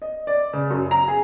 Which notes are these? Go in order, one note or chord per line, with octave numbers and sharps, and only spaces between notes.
D#5
D5
C#3
F#2
A#5
G#4